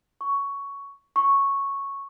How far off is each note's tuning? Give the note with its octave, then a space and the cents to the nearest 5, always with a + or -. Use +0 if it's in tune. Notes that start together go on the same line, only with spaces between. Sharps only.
C#6 +10
C#6 -5